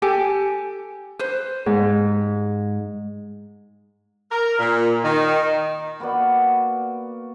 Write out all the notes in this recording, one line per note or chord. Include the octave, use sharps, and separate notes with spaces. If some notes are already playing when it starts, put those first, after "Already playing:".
G4 A4 G#5
B4 C5
G#2
A#4
A#2
D#3
A#3 B3 F#4 D5